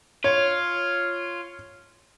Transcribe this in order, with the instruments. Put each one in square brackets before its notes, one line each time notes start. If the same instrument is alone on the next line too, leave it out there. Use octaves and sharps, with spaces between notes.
[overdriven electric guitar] F4 [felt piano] C#5